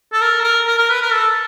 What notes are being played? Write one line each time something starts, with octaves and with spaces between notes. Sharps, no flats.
A4
A#4
A4
A#4
A#4
A#4
B4
A#4
A4